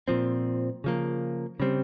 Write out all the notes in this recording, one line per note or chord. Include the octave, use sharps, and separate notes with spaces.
A#2 F3 C4
C#3 F3 A#3
C#3 G3 C4